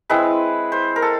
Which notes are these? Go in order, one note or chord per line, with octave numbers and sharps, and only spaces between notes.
G#3 C4 E4 B4
C5
A#4
A4